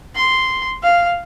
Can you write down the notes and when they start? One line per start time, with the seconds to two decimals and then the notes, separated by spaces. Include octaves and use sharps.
0.15 C6
0.83 F5